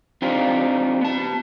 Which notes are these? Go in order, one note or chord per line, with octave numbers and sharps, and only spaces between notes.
C4 D4 D#4 F4 G4
B3 A5